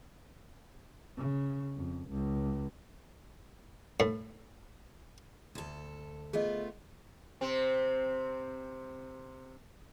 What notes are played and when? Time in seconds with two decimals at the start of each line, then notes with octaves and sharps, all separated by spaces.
1.17 C#3
1.77 F2
2.10 C#2
4.00 A2
5.55 D2 A4
6.33 A3 B3 F4 G#4 D#5
7.41 C3 C4